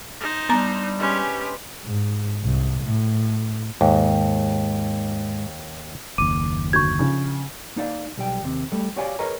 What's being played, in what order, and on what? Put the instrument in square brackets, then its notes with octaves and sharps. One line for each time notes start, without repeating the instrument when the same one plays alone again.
[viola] D#4 C5
[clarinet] G3 [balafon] B3 A#5 [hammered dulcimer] D4
[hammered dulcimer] G#3 B4 C5 [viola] C#4 G4
[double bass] G#2
C2
A2
[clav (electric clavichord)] D#2 [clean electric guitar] G#2
[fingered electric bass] F#1 D#2 [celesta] D6 D#7
[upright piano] D2 [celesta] C#6 G6 G#6
[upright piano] A#1 C#3
[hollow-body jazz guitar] A#3 D#4 D5 F5
B1 G3 G5
D#2 C3
G3 A3
F#4 G4 C#5 D5 F5 G#5
G#4 A#4 B4 C#5 D#5 A#5